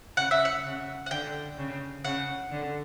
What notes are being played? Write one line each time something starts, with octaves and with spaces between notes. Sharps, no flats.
C#3 F#5
E5
F#5
C#3
F#5
D3 G5
C#3
C#3 F#5
D3